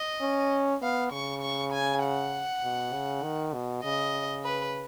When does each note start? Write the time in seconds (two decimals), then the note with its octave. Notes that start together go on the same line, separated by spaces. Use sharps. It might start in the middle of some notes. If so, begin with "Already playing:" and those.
Already playing: D#5
0.21 C#4
0.82 B3 F5
1.12 C#3 C#6
1.42 C#6
1.73 G#5
2.03 F#5
2.64 B2
2.94 C#3
3.23 D#3
3.54 B2
3.84 C#3 D#5
4.45 B4